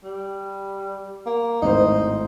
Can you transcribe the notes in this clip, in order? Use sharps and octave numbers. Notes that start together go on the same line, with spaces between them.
G3
A#3
G#1 A2 D#4 C5